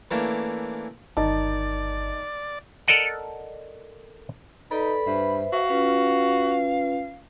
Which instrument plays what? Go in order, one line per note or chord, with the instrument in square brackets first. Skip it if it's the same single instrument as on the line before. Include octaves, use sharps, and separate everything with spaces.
[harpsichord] E3 A3 A#3 C#4 D4
[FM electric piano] G1 [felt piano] D#3 D#4 A5 [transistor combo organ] D5
[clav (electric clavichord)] A4 A#4 D5 D#5 F#5
[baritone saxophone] D#4 [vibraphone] A4 B4 D5 [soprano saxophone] B5
[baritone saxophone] G2 [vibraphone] B4 C5 E5
[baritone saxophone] F#4 [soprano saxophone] F5
[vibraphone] C#4 F4 B4